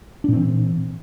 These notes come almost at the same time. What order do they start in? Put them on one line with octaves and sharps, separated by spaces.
D4 A#2 C4 E3